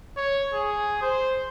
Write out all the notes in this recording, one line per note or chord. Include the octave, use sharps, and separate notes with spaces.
C#5
G#4
C5